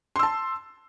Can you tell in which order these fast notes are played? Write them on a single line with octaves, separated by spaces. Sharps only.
C6 E6 A5